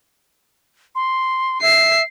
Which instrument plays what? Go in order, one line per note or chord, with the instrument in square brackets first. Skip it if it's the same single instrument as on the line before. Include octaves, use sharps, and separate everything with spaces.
[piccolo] C6
[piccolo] E5 [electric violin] C7